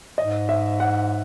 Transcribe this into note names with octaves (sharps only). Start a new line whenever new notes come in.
G#2 D#5
E5
F#5